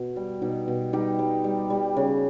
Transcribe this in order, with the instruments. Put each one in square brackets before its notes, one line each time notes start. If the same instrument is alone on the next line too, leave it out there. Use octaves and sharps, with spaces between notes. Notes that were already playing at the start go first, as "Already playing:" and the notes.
Already playing: [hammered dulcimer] B2
G3
B2 D#4 G4
B2
G3 D#4 G4
G3
G3
G3
C#3